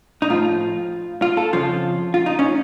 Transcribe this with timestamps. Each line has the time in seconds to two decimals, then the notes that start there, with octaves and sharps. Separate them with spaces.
0.22 D#4
0.30 A2 F3 F4
1.22 F4
1.37 A4
1.53 F2 C#3 F3 F4
2.14 F4
2.26 D#4
2.39 C#4